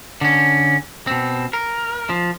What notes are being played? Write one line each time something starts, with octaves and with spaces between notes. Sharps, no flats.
D3 C#4
B2 C4
A#4
F3